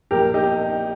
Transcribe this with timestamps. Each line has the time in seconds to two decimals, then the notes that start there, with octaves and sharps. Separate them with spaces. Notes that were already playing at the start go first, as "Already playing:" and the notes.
0.11 A#1 G4 A#4
0.34 D#4 G4